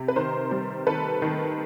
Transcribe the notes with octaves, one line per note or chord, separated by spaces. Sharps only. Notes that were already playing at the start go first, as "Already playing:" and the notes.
Already playing: C3
B4
D#3 A#4 C5
G3
D#3 A4 B4
D#3